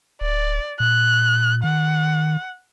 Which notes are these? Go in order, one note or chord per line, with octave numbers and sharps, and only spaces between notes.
D1 D5
A#2 F#6
D#3 F#5